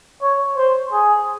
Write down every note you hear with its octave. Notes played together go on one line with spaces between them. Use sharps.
C#5
C5
G#4